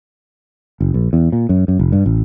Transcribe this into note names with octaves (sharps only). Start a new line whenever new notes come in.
F#1
A#1
E2
A#2
F#2
F#2
F1
G2
A1